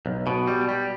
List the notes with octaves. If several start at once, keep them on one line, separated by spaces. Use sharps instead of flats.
B1
B2
G3
G3